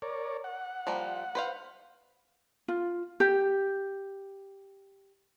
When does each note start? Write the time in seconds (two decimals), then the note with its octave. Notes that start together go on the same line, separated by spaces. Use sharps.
0.02 A#4 C#5 D5
0.44 F#5
0.87 F3 G3 A#3
1.35 B4 C5 F5
2.68 F4
3.20 G4